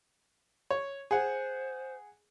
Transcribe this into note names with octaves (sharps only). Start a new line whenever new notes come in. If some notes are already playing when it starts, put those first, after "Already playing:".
C#5
G#4 C5 F#5